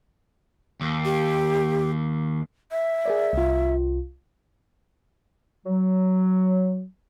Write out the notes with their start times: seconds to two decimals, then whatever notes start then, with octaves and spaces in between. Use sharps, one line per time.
0.81 D#2
1.05 G4
2.71 E5
3.05 G#4 A#4 D5
3.33 C2 F4
5.66 F#3